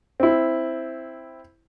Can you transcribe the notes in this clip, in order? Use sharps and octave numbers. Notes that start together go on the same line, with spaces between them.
C4 E4